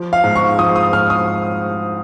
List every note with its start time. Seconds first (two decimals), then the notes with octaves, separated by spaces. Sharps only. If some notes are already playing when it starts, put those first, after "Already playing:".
Already playing: F3
0.13 F5
0.24 G#2
0.35 C#6
0.58 F3 D#6
0.76 D#6
0.93 G#2 F6
1.10 D#6